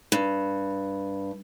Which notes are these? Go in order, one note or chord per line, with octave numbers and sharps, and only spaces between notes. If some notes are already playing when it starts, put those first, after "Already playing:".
G2